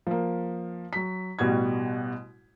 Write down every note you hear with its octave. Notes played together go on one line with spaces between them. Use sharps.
F3 A#3
F#3 B6
A1 B2 G3 F#4 G#6